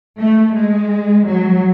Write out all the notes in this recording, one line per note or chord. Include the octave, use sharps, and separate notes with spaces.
A3
G#3
F#3